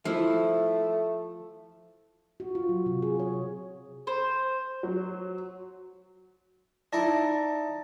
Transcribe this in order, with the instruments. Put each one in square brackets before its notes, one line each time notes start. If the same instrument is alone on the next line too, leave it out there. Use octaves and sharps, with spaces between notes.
[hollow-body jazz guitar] F3 E4 [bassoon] A3
[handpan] F#4
F4
F#3
C3
G#4
C#5
[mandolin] C5
[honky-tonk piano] F#3
[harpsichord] D#4 E4 A#4 [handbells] D5 A5 A#6